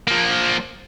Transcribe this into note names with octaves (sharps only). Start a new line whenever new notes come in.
F3 A#3